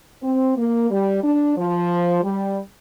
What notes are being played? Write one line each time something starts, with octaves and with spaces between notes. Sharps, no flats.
C4
A#3
G3
D4
F3
G3